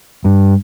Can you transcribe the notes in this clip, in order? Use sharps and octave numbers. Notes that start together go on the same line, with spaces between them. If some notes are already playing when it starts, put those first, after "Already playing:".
G2